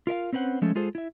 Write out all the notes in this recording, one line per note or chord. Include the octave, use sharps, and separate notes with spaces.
F4 A#4 E5 F5
C4 C#4 B4 C5 F#5
F3 G#3 A3 C#4 A4
G#3 F4 G#4 A4 C5
E4 E5